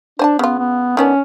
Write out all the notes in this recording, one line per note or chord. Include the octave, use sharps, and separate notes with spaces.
D4 C5 G#5 A5
C#3 B3 F4
B3
D#3 B3 C#4 D4